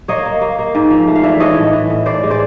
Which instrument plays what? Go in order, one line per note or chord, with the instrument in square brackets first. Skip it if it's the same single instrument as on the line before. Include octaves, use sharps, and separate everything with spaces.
[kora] A#3 C#5 D#5
A#3
A#3
A#3
G#2
F3
A3
F5
E3 D5 E5
E3 C#5 D#5
A2
E3
A2
A2 C5 D5
G#3
C5 D5